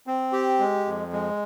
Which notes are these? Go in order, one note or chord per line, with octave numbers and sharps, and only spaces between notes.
C4
G4
G#3
F2
G#3